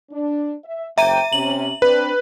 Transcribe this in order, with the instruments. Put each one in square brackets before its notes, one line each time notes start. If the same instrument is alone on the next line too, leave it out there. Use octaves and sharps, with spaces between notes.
[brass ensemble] D4
E5
[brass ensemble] F#1 C5 G5 [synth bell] E5 A#5 D#7
[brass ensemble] C3 C#4 [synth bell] F#7
[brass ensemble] C4 D4 [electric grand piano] B4